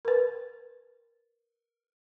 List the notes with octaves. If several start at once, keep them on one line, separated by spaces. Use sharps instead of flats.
A#4 B4